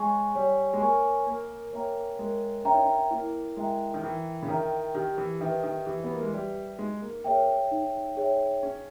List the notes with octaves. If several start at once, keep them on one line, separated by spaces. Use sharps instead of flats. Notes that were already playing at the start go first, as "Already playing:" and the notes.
Already playing: G#3 C#5 G#5 C#6
G3 C#5
G#3
A#3 G#5 C#6
A#3 A#4
A#3 C#5 E5 G5 A#5
G#3 A#4
C#4 C#5 E5 G5 A#5
D#4
C#4
A#3 E4
G#3 A#4 E5 G5 A#5
D#3
E3 E4
C#3
D#3 A#4 E5 G5 A#5
D#3 G4
E3
D#3 B4 E5
D#3
E3 G4
B3
A#3
G#3
G3 B4 E5
G#3 D#4
A#3
A#3 G#4 C#5 E5 G5
D#4
G#4 C#5 E5 G5
C#4 G#4